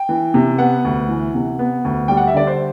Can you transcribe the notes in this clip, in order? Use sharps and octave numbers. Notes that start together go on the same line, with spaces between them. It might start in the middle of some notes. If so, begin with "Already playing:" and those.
Already playing: G5
E3
C3
B3 F#5
D2
E3
C3
B3
D2
G3 G5
F#5
E5
D3 D5
C5